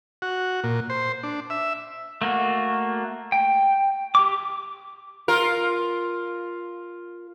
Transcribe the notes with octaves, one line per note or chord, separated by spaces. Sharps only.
F#4
A#2
C5
D4
E5
A3 A#3 F#4
G5
G4 D6
F4 A#4